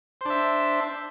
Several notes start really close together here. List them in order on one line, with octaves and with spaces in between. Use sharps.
C5 D4 E5